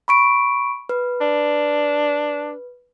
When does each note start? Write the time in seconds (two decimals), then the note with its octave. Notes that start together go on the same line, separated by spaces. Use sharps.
0.08 B5 C#6 D7
0.89 B4
1.21 D4